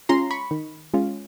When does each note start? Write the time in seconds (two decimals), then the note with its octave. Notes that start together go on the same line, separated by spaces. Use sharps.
0.09 G#3 C#4 F4 A#5 C6
0.31 B5 C#6
0.51 D#3
0.94 G#3 C#4 F4